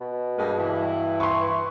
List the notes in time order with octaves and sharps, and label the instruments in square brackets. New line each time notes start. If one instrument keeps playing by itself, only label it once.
[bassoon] B2
[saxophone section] G2 G#3 A#3
G2 E3 E4
[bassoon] B4 [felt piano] C6 C#6